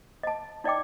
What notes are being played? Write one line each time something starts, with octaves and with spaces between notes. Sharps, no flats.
D#5 A5
D#4 D5 D#5 G5 D6